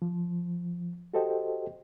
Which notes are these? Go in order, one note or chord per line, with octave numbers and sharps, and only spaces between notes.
F3
F#4 G4 A4 C5 D#5 G5